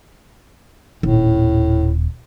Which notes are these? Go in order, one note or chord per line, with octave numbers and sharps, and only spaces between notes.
D#1 A2